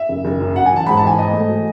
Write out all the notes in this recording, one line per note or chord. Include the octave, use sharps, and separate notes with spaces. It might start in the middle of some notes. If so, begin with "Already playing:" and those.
Already playing: E5
F#1
F#1
F#2
F#2 F#5
G#5
E3 A5
G#2 B5
A5
E3 G#5
G#2 D#5
A3
F#3